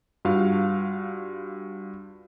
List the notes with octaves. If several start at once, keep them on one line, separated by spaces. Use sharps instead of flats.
G2 F4 F#4 F5